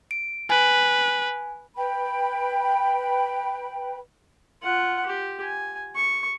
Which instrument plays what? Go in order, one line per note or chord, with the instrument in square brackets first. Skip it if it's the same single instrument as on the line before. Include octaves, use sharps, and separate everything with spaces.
[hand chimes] D7
[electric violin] B4 [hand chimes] G#5
[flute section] B4 G5 B5
[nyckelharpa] F4 F#5
G4
G#5
C#6